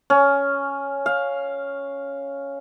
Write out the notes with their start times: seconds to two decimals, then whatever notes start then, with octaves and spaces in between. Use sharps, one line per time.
0.10 C#4
1.06 F5